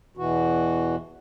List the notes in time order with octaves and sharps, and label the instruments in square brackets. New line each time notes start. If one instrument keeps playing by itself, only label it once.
[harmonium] E2 B2 E3 F#4